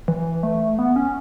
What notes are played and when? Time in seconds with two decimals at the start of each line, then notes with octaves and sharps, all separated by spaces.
0.08 E3
0.43 A3
0.79 B3
0.96 C#4